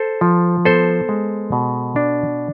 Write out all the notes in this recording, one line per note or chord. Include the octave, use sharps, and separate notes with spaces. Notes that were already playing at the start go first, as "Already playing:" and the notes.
Already playing: A4 C5
F3
B3 A4 C5
G#3
B2
D4